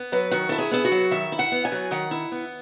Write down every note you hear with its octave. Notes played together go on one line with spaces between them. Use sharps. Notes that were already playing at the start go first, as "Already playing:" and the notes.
Already playing: B3
F#3 B4
D#3 F#4
E4 A4
G#4
B3 E4
F#4
F#3
D#3 E5
E4
F#5
B3
G#5
F#3
D#3 F#5
E4
B3